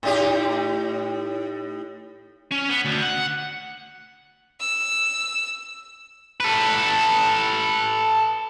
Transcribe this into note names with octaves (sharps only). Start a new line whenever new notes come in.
A2 D#4 G4
C#4
B3
D2
F#5
E6
A4 B4